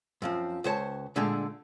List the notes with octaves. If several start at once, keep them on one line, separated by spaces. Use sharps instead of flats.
F#2 F3 C4
C#2 C5 C#5 A5
A#2 D3 G#3 A3 D4 G#4